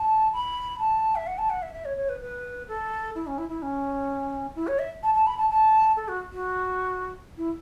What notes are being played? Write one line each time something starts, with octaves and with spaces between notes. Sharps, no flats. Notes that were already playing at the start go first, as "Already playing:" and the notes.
Already playing: A5
B5
A5
E5
F#5
A5
F#5
E5
E5
C#5
C#5
B4
B4
A4
E4
C#4
E4
E4
C#4
E4
C#5
E5
A5
A5
B5
A5
A5
A4
F#4
F#4
E4